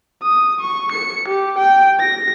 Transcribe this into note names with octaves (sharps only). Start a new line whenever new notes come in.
D#6
C#6
C#7
G4
G5
A#6